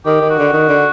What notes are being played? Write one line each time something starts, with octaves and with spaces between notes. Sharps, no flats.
D#3 G4
D#3
F#4
D3
D#3
D3